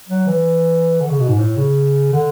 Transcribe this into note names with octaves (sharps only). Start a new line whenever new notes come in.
F#3
E3
D3
C#3
B2
G#2
A2
C#3
D3